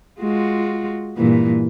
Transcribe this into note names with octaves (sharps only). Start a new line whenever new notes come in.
G#3 F4 F#4
G2 A#2 E3